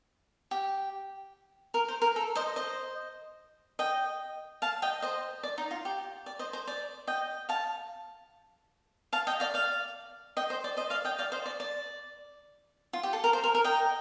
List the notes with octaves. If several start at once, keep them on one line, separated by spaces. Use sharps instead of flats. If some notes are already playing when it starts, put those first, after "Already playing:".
G4
A#4
C5
A#4
A4
C5 D#5
C5 D#5
D#5 G5
F5 A5
D#5 G5
C5 D#5
D5
D#4
F4
G4
D5
C5 D#5
C5
D5
D#5 G5
F5 A5
F5 A5
D#5 G5
D5 F5
D5 F5
D#5 G5
C5
D5
C5 D#5
D5 F5
D#5 G5
D5 F5
C5 D#5
D5
D5
F4
G4
A4
A#4
C5
A#4
A#4
D#5 G5